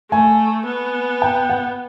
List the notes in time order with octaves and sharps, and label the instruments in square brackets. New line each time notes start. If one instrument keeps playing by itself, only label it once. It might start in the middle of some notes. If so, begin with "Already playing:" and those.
[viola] A3 [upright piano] G#5
[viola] B3
[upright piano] G5
F#5